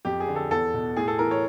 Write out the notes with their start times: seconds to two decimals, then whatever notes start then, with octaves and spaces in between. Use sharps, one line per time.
0.05 F2 G4
0.20 G#4
0.28 D3
0.36 A4
0.51 E2 A4
0.74 B2
0.97 A2 G#4
1.08 A4
1.19 E3 A#4
1.31 C#5